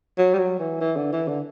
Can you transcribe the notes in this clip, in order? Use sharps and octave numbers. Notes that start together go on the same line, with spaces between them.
F#3
G3
F#3
E3
E3
D3
E3
D3